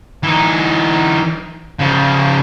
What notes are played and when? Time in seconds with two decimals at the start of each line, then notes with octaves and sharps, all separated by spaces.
0.23 E3 D#4
1.79 C#3 F3